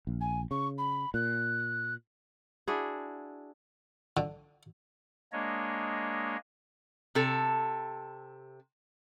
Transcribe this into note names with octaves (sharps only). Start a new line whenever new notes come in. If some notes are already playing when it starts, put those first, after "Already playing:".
A#1
G#5
C#3 C#6
B5
A#2 F#6
D4 E4 F#4 G#4
D3
G#3 A#3 D4 C#5 D#5
C3 A4